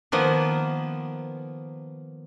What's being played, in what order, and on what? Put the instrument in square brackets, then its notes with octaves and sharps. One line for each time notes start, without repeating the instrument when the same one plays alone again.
[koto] D#3 F3 A#3 B3